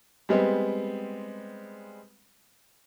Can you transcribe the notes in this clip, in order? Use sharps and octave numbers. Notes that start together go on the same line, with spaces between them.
G3 G#3 B3 C4